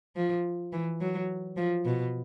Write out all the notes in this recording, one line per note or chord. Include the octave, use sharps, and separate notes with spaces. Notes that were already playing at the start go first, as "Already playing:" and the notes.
F3
E3
F#3
F3
B2